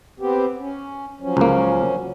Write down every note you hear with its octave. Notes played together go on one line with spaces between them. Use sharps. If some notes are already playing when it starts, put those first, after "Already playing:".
B3 C4 G4
C#4
F3 F#3 C#4
C#2 A#3